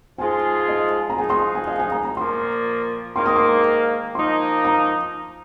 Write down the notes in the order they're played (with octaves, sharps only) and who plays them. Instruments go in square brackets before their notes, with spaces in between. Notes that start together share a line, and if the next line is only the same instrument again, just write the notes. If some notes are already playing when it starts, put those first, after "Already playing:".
[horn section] G#2 F3 G#3 F4 G#4 [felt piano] G#5
[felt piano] D#5
A#5
[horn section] F3 G#3 D#4 G#4 [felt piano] G#5
[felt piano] C6
G#5
F5
G#5
A#5
A#5
[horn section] A#2 F3 A#3 [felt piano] C6
[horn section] G#2 D#3 A#3 [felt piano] C6
[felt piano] D#6
C6
[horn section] F3 A#3 D#4 [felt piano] C6
[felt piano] A#5